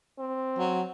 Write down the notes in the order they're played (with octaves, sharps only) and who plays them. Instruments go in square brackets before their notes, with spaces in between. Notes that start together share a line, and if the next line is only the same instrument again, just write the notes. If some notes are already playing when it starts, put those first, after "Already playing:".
[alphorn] C4
[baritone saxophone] F#3